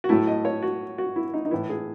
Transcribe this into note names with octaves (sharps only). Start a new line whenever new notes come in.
F#4
A2 F#3 A3 E4
D#5
C#5
F#4
F#4
E4
D#4
D#4
A2 E3 B3 E4
G#4